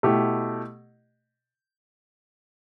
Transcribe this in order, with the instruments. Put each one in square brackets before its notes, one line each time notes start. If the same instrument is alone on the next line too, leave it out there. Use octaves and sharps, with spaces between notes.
[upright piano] B2 A3 E4 G4